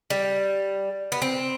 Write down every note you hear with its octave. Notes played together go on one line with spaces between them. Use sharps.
G3
B3
C4